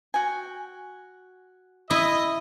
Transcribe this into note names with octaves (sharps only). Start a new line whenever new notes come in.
F#4 G5 G#5
E4 D#5